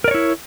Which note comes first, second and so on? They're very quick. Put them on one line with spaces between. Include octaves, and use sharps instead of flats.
A#4 D5 C#5 E4